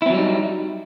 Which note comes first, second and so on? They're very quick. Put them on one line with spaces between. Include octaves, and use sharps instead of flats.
E4 C4 F#3 G3 D#4